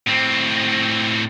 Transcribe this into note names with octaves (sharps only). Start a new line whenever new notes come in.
A2 C4